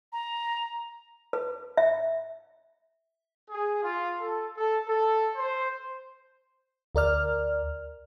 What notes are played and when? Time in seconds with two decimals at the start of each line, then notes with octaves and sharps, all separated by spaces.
0.13 A#5
1.33 B4
1.77 E5
3.50 G#4
3.82 F4
4.19 A4
4.56 A4
4.87 A4
5.35 C5
6.95 D2 A#4 D5 F6